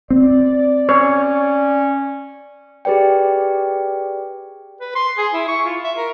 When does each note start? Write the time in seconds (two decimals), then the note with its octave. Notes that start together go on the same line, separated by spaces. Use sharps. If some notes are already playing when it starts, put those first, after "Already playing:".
0.10 C4 D5
0.89 C#4 C#5
2.85 G4 G#4 B4 D5 G5
4.80 B4
4.95 C6
5.18 G#4
5.33 E4
5.48 C#6
5.65 F4
5.84 E5
5.96 A#4